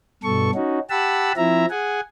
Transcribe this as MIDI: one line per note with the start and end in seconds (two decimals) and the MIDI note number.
0.23 0.51 43
0.23 0.51 47
0.23 0.51 69
0.23 0.51 85
0.54 0.79 61
0.54 0.79 63
0.54 0.79 66
0.90 1.32 67
0.90 1.32 78
0.90 1.32 81
0.90 1.32 83
0.90 1.32 88
1.37 1.65 53
1.37 1.65 60
1.37 1.65 64
1.37 1.65 76
1.37 1.65 82
1.70 2.00 68
1.70 2.00 78
1.70 2.00 80